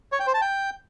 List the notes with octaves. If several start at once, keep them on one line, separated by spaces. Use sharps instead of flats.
C#5
G5
C5
A5
G5